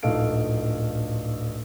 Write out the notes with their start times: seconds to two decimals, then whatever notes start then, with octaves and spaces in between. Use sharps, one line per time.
0.03 D1 A#1 D#4 A4 F5 D7